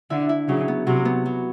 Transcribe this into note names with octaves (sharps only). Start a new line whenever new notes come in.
D3 E4
E4
C#3 F#3
B3
C3 F#3
B3
F#3